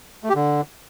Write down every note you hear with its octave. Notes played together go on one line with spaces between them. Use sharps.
A3
G4
D3